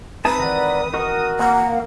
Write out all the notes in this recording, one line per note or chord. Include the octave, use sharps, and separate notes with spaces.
G#3 C4 D#4 B4 E5 G#5 A5 D#6
D#3 E3 D5 F#5 A#5
F#4 A#4 D#5 C#6
A#3 F#5